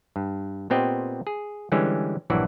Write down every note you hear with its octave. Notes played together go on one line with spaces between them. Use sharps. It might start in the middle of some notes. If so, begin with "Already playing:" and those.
G2
A#2 B3 C4 G4 D#5
G#4
D3 E3 G3 G#3 C#4
A#1 G2 E3 F#3 F#4 D5